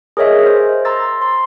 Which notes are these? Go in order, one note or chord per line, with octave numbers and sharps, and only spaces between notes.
G#4 A#4 C#5 D#5 E5
C5
A#5 C6 E6 A6
C6